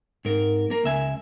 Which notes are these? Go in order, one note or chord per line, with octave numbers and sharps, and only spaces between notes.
G#2 A#4
A#3 A#4
C#2 E5 G#5